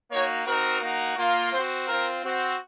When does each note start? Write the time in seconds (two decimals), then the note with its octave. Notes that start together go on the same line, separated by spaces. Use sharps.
0.12 A#3 D#4 F#4 C#5
0.46 C4 D#4 F#4 A#4
0.82 A#3 D#4 F#4
1.18 A#3 F4
1.52 C4 F#4 C5
1.87 C4 F4 A#4
2.23 C4 F#4